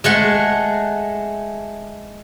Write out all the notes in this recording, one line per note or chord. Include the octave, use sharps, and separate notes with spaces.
G#3 A3 F#5